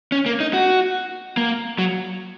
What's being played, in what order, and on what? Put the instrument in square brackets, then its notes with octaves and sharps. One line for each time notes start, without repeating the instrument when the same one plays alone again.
[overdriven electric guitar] C#4
A#3
D#4
F#4
A#3
F#3